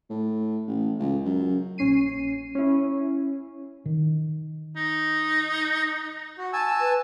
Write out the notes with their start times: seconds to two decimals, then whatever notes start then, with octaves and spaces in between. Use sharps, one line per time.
0.10 A2
0.67 A1
0.99 C#2
1.25 F#2
1.78 A#1 C#4 C7 D#7
2.55 C#4 E4
3.85 D#3
4.76 D#4
6.38 F#4
6.53 G#5 A5 E6
6.80 B4